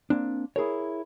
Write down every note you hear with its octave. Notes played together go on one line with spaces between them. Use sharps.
A#3 C4 D4
E4 G#4 A#4 C#5